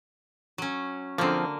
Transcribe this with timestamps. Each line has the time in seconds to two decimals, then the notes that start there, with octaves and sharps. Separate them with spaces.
0.58 F#3 C#4
1.18 D3 F3 A#3 C4